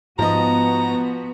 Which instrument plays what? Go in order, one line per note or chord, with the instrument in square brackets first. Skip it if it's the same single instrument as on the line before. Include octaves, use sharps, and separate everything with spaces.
[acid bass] G#2 [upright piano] F3 D#5 [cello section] B3 F#4 [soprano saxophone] A#5